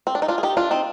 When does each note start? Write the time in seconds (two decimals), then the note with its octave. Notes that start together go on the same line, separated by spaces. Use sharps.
0.07 C4
0.15 D4
0.22 D#4
0.28 D4 F4
0.38 G#4
0.43 D#4 G4
0.57 D4 F4
0.71 C4 D#4